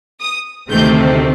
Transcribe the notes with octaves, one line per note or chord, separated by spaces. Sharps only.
D#6
D2 C3 D#3 A3 C4 G6